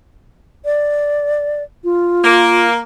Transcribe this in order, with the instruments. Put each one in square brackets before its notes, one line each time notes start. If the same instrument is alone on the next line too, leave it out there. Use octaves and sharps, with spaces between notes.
[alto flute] D5
F4
[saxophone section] A#3